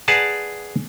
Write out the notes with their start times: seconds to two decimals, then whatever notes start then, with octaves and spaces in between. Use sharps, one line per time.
0.08 G#4 B4 D5 F#5 A5 A#5